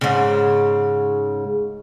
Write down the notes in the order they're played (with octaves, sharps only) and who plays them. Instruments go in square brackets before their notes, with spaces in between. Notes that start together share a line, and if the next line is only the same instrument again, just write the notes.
[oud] G#2 C#3